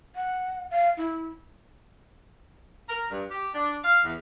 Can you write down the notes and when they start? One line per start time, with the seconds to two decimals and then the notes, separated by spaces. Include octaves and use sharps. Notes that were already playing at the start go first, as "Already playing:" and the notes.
0.15 F#5
0.70 F5
0.97 E4
2.89 A#4
3.11 G2
3.31 G4
3.54 D4
3.84 F5
4.04 E2